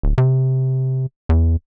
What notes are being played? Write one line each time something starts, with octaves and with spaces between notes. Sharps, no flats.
D1
C3
E2